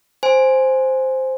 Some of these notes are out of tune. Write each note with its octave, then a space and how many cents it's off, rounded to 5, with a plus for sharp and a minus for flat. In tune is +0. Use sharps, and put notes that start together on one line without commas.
C5 +0 G#5 +0